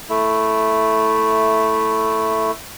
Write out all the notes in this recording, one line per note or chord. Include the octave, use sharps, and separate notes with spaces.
A3 E4